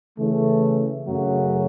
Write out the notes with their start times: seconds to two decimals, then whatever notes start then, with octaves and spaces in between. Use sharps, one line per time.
0.18 C#3 E3 A3
1.05 F#2 C#3 F#3 A3